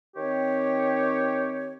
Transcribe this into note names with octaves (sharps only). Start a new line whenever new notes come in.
D#3 C4 G4 C#5